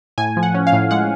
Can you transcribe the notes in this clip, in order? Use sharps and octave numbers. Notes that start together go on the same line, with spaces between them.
A2 G#5
F3
F#5
C#4
F5
A2
G#3 F#5